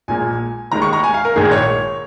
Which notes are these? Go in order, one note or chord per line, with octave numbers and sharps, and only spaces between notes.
A#1 A#2 G#3 G#5
D#2 D#3 G#3 A#5
C#6
A#5
G#5
F5
A#4
A#1 G#2 D#3 A#3 G#4
C#5